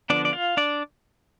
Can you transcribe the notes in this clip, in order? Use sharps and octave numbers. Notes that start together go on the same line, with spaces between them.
D3 F3 B3 D4 D5
D5
F4 F5
D4 D5